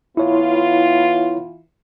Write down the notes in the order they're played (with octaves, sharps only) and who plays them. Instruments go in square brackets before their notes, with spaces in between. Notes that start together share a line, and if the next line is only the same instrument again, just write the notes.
[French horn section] E3 B3 F4 [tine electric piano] E4 C#5